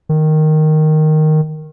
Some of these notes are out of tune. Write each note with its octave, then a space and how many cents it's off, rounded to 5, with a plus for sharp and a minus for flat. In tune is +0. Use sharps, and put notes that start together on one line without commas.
D#3 -5